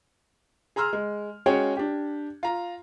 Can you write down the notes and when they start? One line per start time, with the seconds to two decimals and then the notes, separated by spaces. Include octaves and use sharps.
0.76 G#4 A#5 C6 E6 F6
0.93 G#3
1.46 G#3 C#4 F#4 G#4 C#5 G5
1.77 D4 G4
2.43 F4 A#5